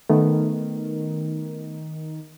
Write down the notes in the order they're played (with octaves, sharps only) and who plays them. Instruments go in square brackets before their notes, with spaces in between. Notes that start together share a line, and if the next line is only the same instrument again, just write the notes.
[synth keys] D#3 [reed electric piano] A3 B3